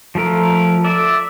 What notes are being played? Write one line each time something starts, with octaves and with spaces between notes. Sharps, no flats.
F3 A3 A#4
D5 E5